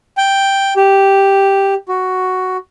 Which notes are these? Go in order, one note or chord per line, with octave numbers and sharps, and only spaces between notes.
G5
G4
F#4